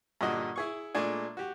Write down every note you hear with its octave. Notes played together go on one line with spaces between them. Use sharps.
G2 A#2 D3 F#4 D#5
E4 G#4 C#6
A#2 G#3 A3 D4 G#4
F#4 G4